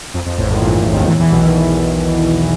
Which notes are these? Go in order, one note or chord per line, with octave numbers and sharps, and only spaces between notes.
F2
F2
A1 A2
G#1 G#2
A#1 A#2
D#2 D#3
E2 E3
E2 E3
B1 B2
D#3